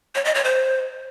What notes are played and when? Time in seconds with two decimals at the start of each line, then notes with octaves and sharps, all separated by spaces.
0.15 C#5
0.25 D#5
0.34 C#5
0.44 C5